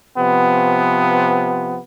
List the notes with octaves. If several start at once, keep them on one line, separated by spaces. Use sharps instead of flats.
C3 F3 B3